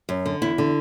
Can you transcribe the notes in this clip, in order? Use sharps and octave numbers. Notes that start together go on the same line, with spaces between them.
F#2
D3
E2 E4
D3